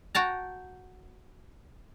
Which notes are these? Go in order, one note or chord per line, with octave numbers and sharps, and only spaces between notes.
F#4 G5 A5 A#5